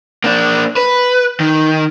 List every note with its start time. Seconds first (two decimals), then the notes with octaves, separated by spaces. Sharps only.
0.24 A#3 D4
0.77 B4
1.40 D#3